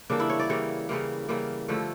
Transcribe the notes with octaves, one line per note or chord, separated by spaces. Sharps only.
C#3 E3 G3 A#3 D4
E4
C#5
D5
C#3 E3 G3 A#3 C#5
C#3 E3 G3 A#3
C#3 E3 G3 A#3
G2 D3 F3 A3